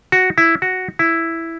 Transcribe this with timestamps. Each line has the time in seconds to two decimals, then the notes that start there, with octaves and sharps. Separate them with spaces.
0.12 F#4
0.38 E4
0.62 F#4
0.99 E4